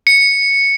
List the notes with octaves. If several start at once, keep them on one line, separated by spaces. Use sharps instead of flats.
C#7